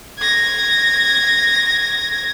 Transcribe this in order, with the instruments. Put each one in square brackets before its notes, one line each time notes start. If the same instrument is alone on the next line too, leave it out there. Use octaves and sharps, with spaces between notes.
[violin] G#6 A#6